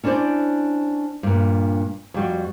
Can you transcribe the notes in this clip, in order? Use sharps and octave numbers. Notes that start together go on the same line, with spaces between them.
C#4 D4 E4 F#4 C5 D5
G2 A#2
F2 G3 F#4